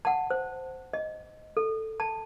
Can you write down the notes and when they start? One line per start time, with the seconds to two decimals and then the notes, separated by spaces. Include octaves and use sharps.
0.05 F#5 A5
0.30 C5
0.93 D#5
1.57 A4
2.00 A5